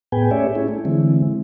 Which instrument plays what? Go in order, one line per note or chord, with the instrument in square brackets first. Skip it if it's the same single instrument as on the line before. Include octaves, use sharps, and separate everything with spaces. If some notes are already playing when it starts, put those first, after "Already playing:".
[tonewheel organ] A2 B3 G#4 B4 G5 G#5
A3 C#4 G4 C#5 D5 E5
C#4 E4 G#4
A3
D3 E3 G#3 C4 E4